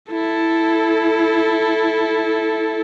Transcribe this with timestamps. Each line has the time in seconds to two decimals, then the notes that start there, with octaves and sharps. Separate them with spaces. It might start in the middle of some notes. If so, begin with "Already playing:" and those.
0.12 E4 A4